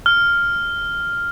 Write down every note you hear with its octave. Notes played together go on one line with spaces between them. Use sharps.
F6